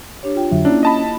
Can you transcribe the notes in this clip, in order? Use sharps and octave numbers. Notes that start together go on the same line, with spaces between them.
D4 G4 C#5
F4 G5
F2 D3 F#3 E5
A#3 C#4 D4 E4
D#5 A5 B5